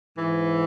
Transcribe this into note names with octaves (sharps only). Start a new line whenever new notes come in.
G#2 E3